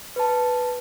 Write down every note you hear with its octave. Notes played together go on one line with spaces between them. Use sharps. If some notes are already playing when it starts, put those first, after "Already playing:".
B4 A5